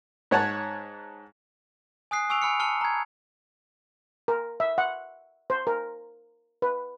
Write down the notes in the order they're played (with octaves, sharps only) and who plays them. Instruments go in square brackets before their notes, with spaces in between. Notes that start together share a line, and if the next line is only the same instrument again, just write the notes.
[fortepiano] G#2 C#5 F#5 A5
[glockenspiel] G#5 D#6 F#6 C7
G#5 C#6 E6 D7 F7
G#5 B5 F6 C#7
A5 F6 C#7 G7
A#5 G#6
[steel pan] A#4
E5
F#5
C5
A#4
B4